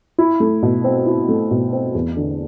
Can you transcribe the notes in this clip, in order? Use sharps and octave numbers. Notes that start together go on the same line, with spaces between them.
E4
A3
B2
C4
E4
A3
B2
C4
E2
D3